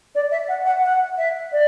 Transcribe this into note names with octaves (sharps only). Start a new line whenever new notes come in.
D5
E5
F#5
F#5
F#5
E5
D5